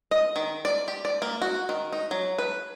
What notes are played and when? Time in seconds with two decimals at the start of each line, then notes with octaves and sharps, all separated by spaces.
0.11 D#5
0.36 D#3
0.65 D5
0.88 G4
1.05 D5
1.22 A#3
1.42 F#4
1.69 D#3
1.93 D#4
2.11 F#3
2.38 B4